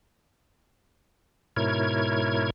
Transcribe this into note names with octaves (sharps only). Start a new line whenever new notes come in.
G#2 B2 E4 A#4 C#5 G#6